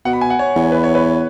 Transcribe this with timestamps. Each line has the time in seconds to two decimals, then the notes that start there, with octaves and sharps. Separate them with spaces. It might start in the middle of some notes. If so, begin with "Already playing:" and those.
0.05 B2 F#5
0.13 B5
0.21 G#5
0.30 F#5
0.39 C#5
0.56 E2
0.72 B4
0.84 C#5
0.95 B4